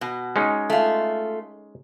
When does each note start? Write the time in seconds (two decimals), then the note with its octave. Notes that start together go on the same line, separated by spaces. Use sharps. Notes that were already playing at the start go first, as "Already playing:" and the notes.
0.01 B2
0.36 G#3 C#4 D#4
0.70 A3 F4